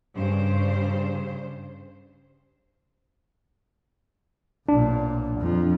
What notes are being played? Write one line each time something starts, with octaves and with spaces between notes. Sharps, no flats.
G2 C#3 C5
B1 A#2 D4
F2 F3